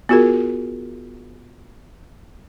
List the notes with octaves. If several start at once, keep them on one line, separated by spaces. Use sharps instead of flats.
B3 F4 F#4 G#4 A#4